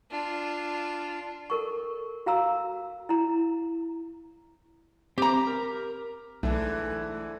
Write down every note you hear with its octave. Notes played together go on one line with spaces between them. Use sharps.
D4 F4
A4 A#4 C#6
F#4 F5 A#5 E6
E4 A#5
C4 G4 A#5 D6
A#4
B1 G#2 D3 E3 A3